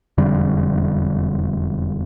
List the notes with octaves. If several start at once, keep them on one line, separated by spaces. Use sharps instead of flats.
E1 F2 D3 G3